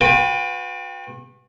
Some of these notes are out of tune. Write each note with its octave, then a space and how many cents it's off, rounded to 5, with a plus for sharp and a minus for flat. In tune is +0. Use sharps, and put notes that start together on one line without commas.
F#4 -40 B4 +15 G5 +20